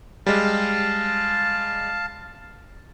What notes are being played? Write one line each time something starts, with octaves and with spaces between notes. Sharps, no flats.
G3 G#3 F5 A5